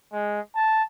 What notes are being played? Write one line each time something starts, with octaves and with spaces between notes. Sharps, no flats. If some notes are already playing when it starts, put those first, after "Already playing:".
G#3
A5